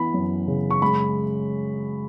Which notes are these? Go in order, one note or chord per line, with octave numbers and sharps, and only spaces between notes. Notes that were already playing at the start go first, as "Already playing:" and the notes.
Already playing: E3 B3 B5
F#2
C#3
C#6
G#3 B5